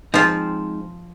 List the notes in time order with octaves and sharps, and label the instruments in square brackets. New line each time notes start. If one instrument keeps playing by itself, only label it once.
[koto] F3 F4 [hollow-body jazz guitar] G#3 C4 D#4